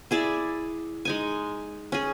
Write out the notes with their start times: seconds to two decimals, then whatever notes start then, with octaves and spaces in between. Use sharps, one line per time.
0.11 E4 G#4 D5 E5
1.05 G#3 D#4 G#5
1.92 C#4 G#4